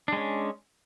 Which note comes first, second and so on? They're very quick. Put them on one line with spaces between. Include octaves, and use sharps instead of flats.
D4 G#3 C#4